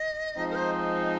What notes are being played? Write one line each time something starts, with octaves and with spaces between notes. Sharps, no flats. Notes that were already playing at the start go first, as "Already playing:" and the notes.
Already playing: D#5
F3 G#3 C4 D#4
A#4
C5